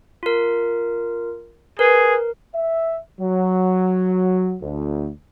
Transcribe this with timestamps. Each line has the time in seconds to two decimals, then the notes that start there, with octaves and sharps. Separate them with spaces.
0.23 F4 A#4
1.79 G#4 A#4 B4
2.54 E5
3.20 F#3
4.62 D2